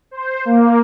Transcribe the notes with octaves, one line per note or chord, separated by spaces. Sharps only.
C5
A#3